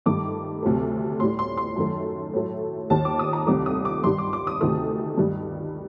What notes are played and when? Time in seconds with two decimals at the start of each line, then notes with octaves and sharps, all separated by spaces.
0.06 G2 D#3 A3 D6
0.63 D2 C3 F#3 A3
1.20 A2 G3 C6
1.39 C6
1.57 C6
1.76 F#2 D#3 A3
2.33 A2 F#3 A3
2.90 D#2 D#3 G3 A5
3.05 D6
3.19 D#6
3.33 A#5
3.47 C2 C3 D#3 A3 D6
3.66 D#6
3.85 D6
4.04 G2 D#3 G3 C6
4.18 D6
4.33 D6
4.47 D#6
4.61 D2 C3 D#3 A3 D#6
5.17 G2 D#3 G3